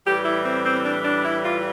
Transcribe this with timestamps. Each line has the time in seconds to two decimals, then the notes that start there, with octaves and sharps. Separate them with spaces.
0.05 A2 E3 G3 G4
0.26 E4
0.46 C4
0.65 C4
0.85 D4
1.05 D4
1.25 E4
1.45 F4